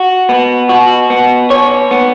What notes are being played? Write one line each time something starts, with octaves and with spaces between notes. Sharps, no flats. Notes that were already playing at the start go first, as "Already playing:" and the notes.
Already playing: F#4
B3
F#4
B3
C#5
B3